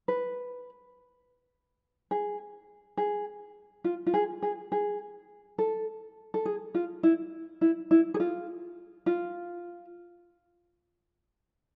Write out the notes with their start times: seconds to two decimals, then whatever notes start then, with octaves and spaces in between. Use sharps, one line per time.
0.08 B4
2.11 G#4
2.97 G#4
3.84 F4
4.06 F4
4.14 G#4
4.42 G#4
4.72 G#4
5.58 A4
6.34 A4
6.45 G#4
6.75 F4
7.03 E4
7.61 E4
7.91 E4
8.14 G#4
8.20 F4
9.06 F4